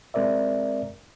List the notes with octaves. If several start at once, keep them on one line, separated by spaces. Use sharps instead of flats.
G#3 C4 A#4 D5 E5